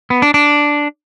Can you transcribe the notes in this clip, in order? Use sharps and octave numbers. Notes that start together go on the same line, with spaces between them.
B3
D4
D4